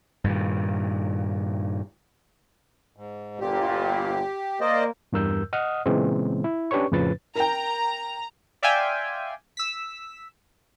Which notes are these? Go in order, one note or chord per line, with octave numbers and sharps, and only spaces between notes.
G2 A#2 D#3
G#2
G1 A#2 G4
A#3 C5 D5 D#5
E2 G2 A#4 E6 G6
D#5 F#5 D#6 F6
A#2 C#3 E3 G#3 B3 C4
E4
C#4 D4 G4 B4 C#5 C#6
F2 A2 C#3 F3 B4 A6
A#4 G5 A#5
D5 E5 F5 G5 G#5 C6
E6 B6